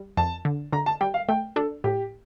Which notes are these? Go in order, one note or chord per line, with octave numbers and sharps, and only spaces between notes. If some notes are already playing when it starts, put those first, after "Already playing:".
Already playing: G3
F2 A5
D3
D3 A#5
A5
G3 G5
F5
A3 G5
D4 A4
A2 G4